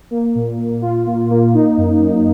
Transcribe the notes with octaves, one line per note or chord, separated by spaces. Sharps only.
A#3
A#2
A#2
F4
A#3
A#3
D#4
F#2
F#2